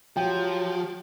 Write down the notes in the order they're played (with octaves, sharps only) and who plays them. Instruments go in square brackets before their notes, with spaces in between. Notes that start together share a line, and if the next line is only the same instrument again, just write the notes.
[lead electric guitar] F3 [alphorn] F#3 [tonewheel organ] F4 G4 [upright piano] G5